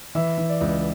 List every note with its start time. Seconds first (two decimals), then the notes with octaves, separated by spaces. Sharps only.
0.15 E3 E5
0.38 E3
0.49 D5
0.61 C#2